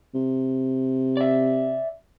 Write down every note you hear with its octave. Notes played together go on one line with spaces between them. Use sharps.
C3
D5 E5